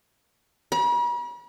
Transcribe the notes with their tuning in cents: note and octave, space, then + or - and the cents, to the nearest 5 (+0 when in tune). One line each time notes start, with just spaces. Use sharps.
B5 -45